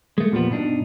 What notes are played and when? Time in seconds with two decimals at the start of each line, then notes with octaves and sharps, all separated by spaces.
0.18 G#3 A3
0.32 E2 A#2 F3 G3 B3
0.50 G2 B2 A#3 D4 D#4